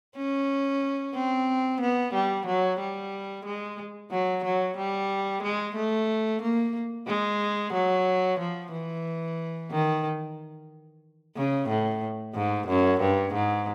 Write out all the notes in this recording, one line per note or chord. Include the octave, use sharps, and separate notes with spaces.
C#4
C4
B3
G3
F#3
G3
G#3
F#3
F#3
G3
G#3
A3
A#3
G#3
F#3
F3
E3
D#3
C#3
A2
G#2
F#2
G2
G#2